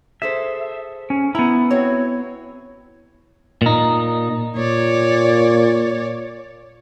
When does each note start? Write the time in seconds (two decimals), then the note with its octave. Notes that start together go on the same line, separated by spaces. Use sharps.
0.22 G#4 A4 C5 E5
1.10 C#4
1.35 B3 E4 A#5
1.70 C4 F#4 C#5
3.62 A#2 D#4
4.56 A#2 C#5 D5